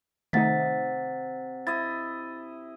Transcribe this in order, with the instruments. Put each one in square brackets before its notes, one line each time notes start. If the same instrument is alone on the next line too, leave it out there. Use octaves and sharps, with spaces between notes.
[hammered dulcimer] C3 [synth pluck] D#3 A3 D#4 [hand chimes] F#5 A6 B6
[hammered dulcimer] E4 D#5 [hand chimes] A6